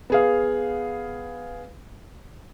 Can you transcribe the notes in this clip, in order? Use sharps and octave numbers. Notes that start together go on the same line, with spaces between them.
B3 G#4 F5